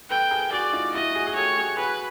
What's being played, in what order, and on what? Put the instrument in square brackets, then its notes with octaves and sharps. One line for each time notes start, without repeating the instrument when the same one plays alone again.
[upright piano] A4 B4 [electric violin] G5
[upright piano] G#4 A#4
[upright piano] F#4 G#4 [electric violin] D5
[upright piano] D#4 F4
[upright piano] E4 F#4 [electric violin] D#5
[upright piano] F#4 G#4
G#4
[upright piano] G4 A4 [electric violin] C#5
[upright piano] F#4 G#4
[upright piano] F#4 G#4 [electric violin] B4